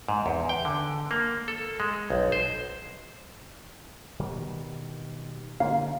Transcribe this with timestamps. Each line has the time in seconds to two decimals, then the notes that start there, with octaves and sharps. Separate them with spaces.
0.09 G#2
0.26 E2
0.49 G5
0.65 D3
1.11 A#3
1.48 A4
1.80 G#3
2.10 B1
2.32 C5
4.20 B2 D#3 G3
5.60 D3 A#3 C#4 F5